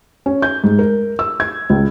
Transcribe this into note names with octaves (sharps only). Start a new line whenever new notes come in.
C#4
G6
G#2
A#4
E6
G#6
C#2